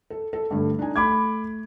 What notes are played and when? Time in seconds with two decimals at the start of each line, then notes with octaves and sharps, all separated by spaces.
0.10 A4
0.33 A4
0.51 G2 D3 A3
0.79 D4 D#4 G#5
0.96 A3 B5 D6 G#6